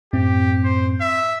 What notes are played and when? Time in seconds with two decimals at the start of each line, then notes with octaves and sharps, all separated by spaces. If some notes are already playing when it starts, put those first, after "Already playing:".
0.13 F#2 A2 C4 G4
0.64 C5
1.01 E5